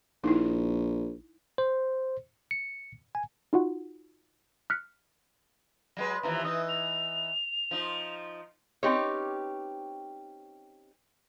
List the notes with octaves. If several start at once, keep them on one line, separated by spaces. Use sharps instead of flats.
A#1 D#4 E4
C5
C#7
G#5
D#4 F4 F#4 F#5
F6 F#6 B6 C#7
F#3 G#3 B4
D#2 E3 F3 A#5
E3 D#4 D#6
F7
F3 D#4
C4 C#4 D#4 G4 B4 C#5